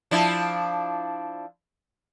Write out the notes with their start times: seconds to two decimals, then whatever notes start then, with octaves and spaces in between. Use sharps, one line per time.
0.11 F3 D4 E4